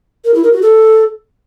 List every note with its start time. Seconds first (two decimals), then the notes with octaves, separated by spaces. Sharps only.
0.24 A#4
0.34 E4
0.43 A#4
0.52 F#4
0.61 A4